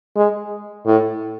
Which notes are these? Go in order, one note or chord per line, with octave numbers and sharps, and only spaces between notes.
G#3
A2